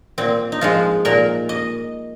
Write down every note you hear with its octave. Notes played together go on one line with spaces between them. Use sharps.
A#2 C4
D#4
F3 G#3 F4
A#2 A#4
D#5